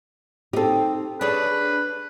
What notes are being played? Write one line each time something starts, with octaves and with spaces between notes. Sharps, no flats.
C4 D#4 G4 A4
D4 G#4 B4 C#5